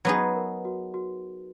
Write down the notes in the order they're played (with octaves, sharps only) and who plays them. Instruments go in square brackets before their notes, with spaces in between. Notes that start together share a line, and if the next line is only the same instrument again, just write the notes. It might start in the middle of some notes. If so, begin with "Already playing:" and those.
[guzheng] F#3 B3 D#4 G#4 [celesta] B4
[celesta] A#4
F#4
F#4